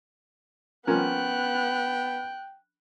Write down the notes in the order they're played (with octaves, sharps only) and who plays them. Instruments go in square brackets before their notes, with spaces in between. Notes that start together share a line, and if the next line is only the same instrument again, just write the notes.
[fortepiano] F3 C#4 A#4 [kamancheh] B3 [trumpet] G5 [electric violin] F#6